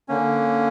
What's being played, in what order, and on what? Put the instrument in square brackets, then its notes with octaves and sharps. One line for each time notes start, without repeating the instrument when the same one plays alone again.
[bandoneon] D3 A#3 C#4